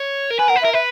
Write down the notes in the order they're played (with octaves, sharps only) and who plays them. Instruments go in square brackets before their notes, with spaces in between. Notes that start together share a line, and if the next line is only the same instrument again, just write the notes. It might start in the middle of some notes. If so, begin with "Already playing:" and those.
Already playing: [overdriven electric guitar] C#5
A#4
[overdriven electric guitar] B4 [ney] G#5
[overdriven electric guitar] A#4 [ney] F#5
[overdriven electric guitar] B4
[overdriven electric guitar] A#4 [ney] E5
[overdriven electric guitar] B4 [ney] E5